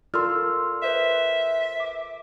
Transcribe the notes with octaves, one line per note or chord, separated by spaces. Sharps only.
F4 A4 A#4 D5 C6 E6 F6
B4 C5 D#5 E5
D6